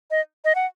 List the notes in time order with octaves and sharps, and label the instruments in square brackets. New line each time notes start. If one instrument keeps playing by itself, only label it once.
[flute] D#5
D#5
F#5